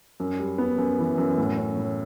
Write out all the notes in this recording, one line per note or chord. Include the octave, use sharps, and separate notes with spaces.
F#2
G3
B3
F#2
E3
F#2
A2
C#4
A2